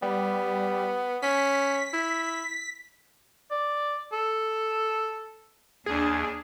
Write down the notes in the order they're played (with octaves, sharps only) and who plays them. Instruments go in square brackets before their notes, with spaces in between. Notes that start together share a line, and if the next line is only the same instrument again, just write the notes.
[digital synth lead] G3 [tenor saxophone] B3
[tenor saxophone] C#4 [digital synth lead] B6
[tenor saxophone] E4
[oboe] D5
A4
[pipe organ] D#2 [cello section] D4 [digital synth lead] G#4